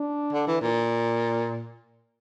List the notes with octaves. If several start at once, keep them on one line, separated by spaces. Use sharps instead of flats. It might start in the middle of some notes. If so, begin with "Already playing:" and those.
Already playing: D4
D3
E3
A#2